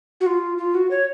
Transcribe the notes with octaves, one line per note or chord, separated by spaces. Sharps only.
F#4
F4
F4
F#4
C#5